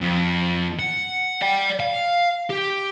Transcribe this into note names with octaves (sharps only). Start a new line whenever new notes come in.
F2
F#5
D5 G5
F5
G4